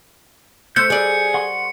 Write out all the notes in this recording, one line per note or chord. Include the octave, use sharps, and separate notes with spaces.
A3 C5 E6 F#6 G6 C#7
G3 G#4 D5
F#5 C6 C#6